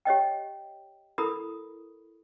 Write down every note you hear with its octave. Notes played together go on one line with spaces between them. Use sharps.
G4 C#5 D#5 G5
E4 A4 A#4 B5 D#6